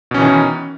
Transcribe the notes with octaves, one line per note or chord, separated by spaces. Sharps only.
B2 D#3 E3 C#4